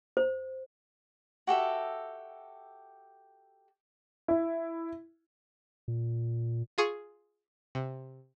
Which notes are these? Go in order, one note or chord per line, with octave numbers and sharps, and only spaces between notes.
C5
F#4 G4 A4 E5
E4
A#2
F4 G#4 C#6
C3